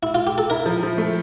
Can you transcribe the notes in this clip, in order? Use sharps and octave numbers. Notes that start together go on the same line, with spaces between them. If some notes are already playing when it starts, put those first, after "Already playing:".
E4
F4
G4
A4
E4 A#4
F3
F3
A3